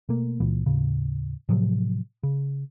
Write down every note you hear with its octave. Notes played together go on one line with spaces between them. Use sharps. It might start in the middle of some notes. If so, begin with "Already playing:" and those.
B2 A3 A#3
C#2 A#2 E3
D#2 A2 C#3
A2 C3 F3 F#3
C#3